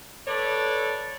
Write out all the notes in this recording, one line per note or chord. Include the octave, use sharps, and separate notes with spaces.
A4 B4 C#5 D5